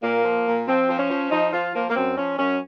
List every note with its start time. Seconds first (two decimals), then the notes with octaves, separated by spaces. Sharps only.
0.03 A#2 A#3
0.25 F3
0.46 A#2
0.68 F3 C4
0.89 F3
0.99 C#4
1.10 F3
1.32 F3 D#4
1.53 F3 F4
1.74 F3 A#3
1.90 A#3
1.96 F#2 C4
2.17 F3 C#4
2.39 F#2 C#4